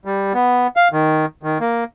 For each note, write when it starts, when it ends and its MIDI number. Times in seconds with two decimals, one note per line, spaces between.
0.05 0.33 55
0.34 0.67 59
0.77 0.88 77
0.92 1.25 51
1.43 1.58 51
1.60 1.84 58